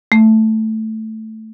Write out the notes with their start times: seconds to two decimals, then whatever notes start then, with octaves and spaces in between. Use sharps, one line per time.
0.12 A3